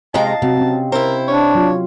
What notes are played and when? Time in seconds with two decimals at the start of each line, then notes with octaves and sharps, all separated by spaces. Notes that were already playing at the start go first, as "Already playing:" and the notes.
0.14 C3 G#3 D#5 F5 A5 A#5
0.42 C3 F#3 C4
0.57 C4 C#4
0.92 E4 A#4 C5
1.28 D4 C#5
1.55 F#3 F4